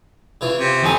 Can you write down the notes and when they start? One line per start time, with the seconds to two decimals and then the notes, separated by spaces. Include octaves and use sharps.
0.41 C#3 E3 F4
0.59 C3
0.83 F2 D#3 C4 G#5 A#5